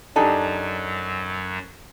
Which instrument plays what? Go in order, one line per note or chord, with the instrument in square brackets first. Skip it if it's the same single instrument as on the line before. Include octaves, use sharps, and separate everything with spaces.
[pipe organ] F#2 F#3 [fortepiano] D4 D#4 G4 [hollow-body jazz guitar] A4 G#5 A5